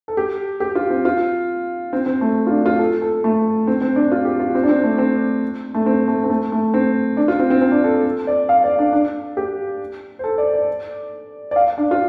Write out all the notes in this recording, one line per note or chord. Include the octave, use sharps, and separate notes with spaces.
A4
G4
G4
F4
C4
F4
C4
C4
A3
F4
D4
F4
A4
A4
A3
C4
C4
D4
F4
G4
F4
C4
D4
C4
A3
C4
A3
C4
A3
C4
A3
A3
C4
D4
F4
C4
C4
C4
D4
A4
A4
D5
F5
D5
D4
D4
G4
C5
A4
D5
D5
D5
F5
D4
F4